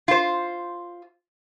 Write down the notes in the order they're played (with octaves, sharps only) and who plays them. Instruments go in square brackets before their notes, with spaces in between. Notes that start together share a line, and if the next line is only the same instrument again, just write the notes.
[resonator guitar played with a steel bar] F4 C5